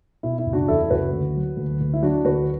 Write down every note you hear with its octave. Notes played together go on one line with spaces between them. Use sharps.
B2 E4
E4
F#1
D4 F#4
E2 E4 A4
A4
F#1 F#4 B4
D2
F#3
D2
D2
E4
F#3 D4 F#4
D2 F#4 B4